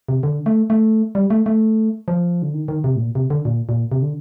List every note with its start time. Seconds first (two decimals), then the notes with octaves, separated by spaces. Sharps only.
0.09 C3
0.23 D3
0.46 A3
0.70 A3
1.15 G3
1.30 A3
1.46 A3
2.08 F3
2.42 D3
2.54 D#3
2.68 D#3
2.84 C3
2.96 A2
3.00 A#2
3.15 C3
3.30 D3
3.45 A#2
3.69 A#2
3.92 C3
4.02 D3